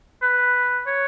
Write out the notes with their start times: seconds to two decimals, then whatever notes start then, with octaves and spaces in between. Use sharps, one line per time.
0.22 B4
0.87 C#5